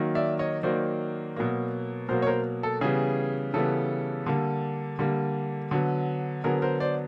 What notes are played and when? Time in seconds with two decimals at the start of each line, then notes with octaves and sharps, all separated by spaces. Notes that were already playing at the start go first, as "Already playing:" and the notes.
Already playing: D#3 F#3 A#3
0.15 D5 E5
0.39 C#5 D#5
0.63 D#3 F#3 A#3 C5 D5
1.36 B2 F#3 A#3
2.08 B2 F#3 A#3 A#4 C5
2.22 C#5
2.26 A#4 C5
2.63 A4
2.81 C#3 E3 G3 B3 G#4
3.54 C#3 E3 G3 B3 A4
4.26 D3 G3 A#3
4.99 D3 G3 A#3
5.71 D3 F#3 B3
6.44 D3 F#3 B3 G#4 A#4
6.62 A#4 C5
6.80 C5 D5